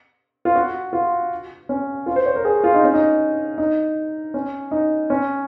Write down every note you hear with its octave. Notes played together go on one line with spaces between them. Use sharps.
F4
F#4
F4
C#4
F4
C5
C#5
A#4
G#4
F4
D#4
C#4
D#4
D#4
C#4
D#4
C#4